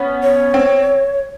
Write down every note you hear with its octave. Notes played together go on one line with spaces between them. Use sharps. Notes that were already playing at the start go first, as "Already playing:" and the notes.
Already playing: B3 C#4
C#5
C4